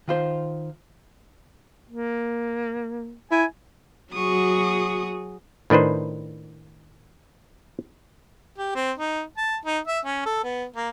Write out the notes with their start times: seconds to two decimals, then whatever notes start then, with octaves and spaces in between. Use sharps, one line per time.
0.08 D#3 F4 C5
1.90 A#3
3.31 E4 G#5
4.13 F#3 F#4 G#4 C#6 D#6
5.70 A2 D#3 D4 B4 C5
8.58 G4
8.75 C4
8.98 D#4
9.37 A5
9.65 D#4
9.87 E5
10.05 C#4
10.26 A4
10.44 B3
10.76 A#3